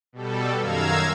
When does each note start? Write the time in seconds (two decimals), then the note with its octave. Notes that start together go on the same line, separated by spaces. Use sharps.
0.13 B2 G3 A4
0.60 F#2 D#3 F5 A#5 E6 G#6